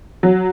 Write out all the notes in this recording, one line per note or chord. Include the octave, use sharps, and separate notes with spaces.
F#3